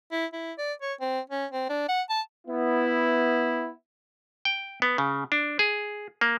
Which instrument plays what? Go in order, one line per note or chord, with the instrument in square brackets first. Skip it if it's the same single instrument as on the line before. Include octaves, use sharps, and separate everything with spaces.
[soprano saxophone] E4
E4
D5
C#5
C4
C#4
C4
D4
F#5
A5
[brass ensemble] B3 E4
[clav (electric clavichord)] G5
B3
C#3
D4
G#4
A#3